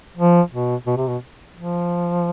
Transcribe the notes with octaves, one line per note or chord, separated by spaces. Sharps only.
F3
B2
B2
C3
B2
F3